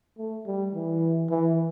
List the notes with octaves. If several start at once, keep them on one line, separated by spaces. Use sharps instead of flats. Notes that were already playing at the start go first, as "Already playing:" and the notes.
A3
G3
E3
E3